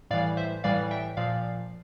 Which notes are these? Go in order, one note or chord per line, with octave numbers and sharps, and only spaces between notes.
A2 E3 G3 D5 F5
C5 E5
A2 E3 G3 D5 F5
E5 G5
A#2 F3 D5 F5